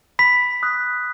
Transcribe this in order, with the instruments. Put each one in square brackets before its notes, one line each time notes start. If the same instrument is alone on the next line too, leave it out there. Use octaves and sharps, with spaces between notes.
[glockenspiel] B5 B6
D#6 F#6